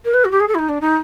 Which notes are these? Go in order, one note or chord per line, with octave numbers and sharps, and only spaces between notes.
A#4
B4
F#4
G4
G#4
A4
E4
D#4
D4
D#4